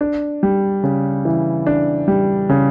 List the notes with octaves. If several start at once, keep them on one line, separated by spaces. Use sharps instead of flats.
D4
G3
C#3
E3
D4
G3
C#3